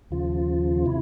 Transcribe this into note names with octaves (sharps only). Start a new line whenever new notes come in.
D#2 C#3 F3 F4
C3 E4